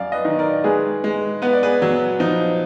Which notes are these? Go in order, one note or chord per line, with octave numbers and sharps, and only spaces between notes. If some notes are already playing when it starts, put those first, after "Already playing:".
Already playing: F#2 D5 F5
B4 D#5
D#3
A#4 D5
G#3 G#4 B4
G#3
B3 B4
D5
G#4 B4
F#3
F3 D#4